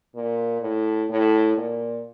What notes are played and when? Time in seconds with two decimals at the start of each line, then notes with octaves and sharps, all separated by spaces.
0.16 A#2
0.62 A2
1.10 A2
1.58 A#2